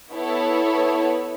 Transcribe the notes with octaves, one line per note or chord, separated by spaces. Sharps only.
B3 E4 A4 C#5